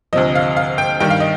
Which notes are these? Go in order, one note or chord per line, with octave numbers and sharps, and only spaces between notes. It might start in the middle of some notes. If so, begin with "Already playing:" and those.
D2 C3 F3 D#5
F5
F5
G5
G2 D#3 G3 G5
F5
D#5